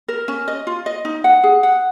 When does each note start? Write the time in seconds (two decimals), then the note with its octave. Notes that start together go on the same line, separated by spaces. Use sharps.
0.08 A#4
0.28 C#4
0.48 D#5
0.67 F4
0.86 D#5
1.05 D#4
1.24 F#5
1.43 G#4
1.63 F#5